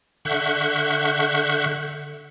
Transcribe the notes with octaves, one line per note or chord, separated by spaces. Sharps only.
D3 E5 F#5 C#6 F#6 G6